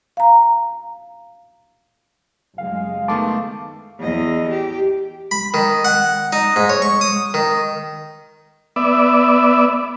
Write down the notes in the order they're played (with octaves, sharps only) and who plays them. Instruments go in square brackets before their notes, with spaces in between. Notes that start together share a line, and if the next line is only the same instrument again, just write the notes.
[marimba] F5 A#5
[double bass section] F#1 G#3 [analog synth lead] F5
[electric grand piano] D#3 A3 B3 [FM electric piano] A5 C6 D6
[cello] E2 D#5
G4
[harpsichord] B5
D#3
F#5
D#4
G#2
C#5
C#6
D#6
D#3
[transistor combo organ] B3 D5 E5